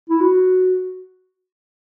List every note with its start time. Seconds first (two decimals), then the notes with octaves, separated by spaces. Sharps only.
0.10 E4
0.21 F#4